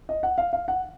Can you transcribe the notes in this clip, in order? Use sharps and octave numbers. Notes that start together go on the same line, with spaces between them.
D#5
F#5
F5
F5
F#5